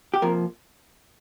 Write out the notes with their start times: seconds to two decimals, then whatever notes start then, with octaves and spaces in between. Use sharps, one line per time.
0.14 G4
0.22 F2 C3 F3 A#3 A#4